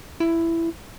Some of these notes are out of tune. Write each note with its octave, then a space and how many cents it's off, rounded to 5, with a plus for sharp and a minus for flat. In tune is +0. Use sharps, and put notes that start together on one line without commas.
E4 +10